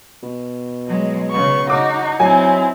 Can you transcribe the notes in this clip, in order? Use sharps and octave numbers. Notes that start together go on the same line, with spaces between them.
B2
F#3 G#3
C#3 B3 C#6
D#4 F#4 D6
F#3 C4 E4 G#5